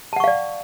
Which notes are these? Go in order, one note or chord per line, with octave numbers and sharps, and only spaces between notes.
D5 F5 F#5 A5 C#6